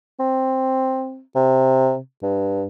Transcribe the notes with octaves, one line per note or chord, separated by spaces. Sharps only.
C4
C3
G2